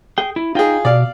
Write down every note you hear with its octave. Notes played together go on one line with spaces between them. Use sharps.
G#4 G5
E4
D#4 F4 G#4 G5
B2 D5 F5